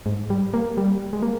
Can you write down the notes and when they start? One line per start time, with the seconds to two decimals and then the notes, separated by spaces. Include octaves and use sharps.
0.06 G#2
0.30 G3
0.54 A#3
0.77 G3
1.13 G#3
1.22 A#3